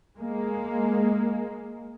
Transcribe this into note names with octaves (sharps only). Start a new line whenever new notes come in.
G#3 A#3